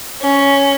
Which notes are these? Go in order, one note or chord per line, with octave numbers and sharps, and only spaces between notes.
C#4